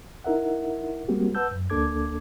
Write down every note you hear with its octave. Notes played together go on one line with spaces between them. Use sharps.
D#4 E4 A#4 E5 F#5
G3 G#3 A#3 C4 F#4 G4
B4 F#5 A5 E6 G6
F#2
D2 A#3 D4 A4 D6 G#6